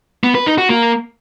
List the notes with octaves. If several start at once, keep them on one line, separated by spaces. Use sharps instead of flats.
B3
B4
D#4
F#4
A#3